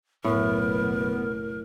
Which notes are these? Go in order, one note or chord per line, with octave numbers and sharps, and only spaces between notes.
F#1 B1 F#2 A2 B3 A#4